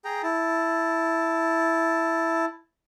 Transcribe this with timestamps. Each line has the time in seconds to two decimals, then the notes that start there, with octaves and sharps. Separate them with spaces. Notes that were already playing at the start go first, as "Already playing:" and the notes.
0.05 G#4 G5 A#5
0.23 E4 A5